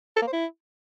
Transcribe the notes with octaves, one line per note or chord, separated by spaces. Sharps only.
A4
A#3
C5
E4